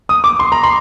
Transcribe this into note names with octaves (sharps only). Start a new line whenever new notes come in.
D#6
D6
C6
A#5
C6